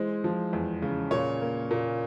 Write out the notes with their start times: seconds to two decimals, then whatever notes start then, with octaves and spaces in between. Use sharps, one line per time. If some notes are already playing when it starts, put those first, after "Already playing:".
Already playing: E3 G#3 C5
0.24 F3
0.53 E2
0.82 C#3
1.11 A#2 C#5
1.41 A#3
1.71 A#2